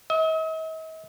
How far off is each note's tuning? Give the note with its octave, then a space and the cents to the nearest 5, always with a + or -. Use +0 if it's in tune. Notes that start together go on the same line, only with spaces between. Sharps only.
D#5 +45